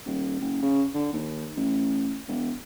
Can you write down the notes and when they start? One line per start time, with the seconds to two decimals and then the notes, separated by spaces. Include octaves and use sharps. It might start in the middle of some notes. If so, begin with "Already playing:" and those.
0.05 D#1
0.40 F#1
0.62 C#3
0.94 D3
1.13 D#2
1.56 A1
2.28 E1